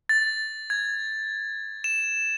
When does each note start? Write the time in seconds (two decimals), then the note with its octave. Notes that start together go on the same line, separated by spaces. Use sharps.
0.09 A6
0.70 G#6
1.84 E7